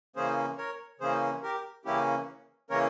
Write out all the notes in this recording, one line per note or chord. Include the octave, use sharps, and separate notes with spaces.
C#3 E3 A#3 C#4 G#4 C5
A#4 C#5
C#3 E3 A#3 C#4 G#4 C5
G4 A#4
C#3 E3 A#3 C#4 E4 G4
C#3 E3 A#3 C#4 A#4 C#5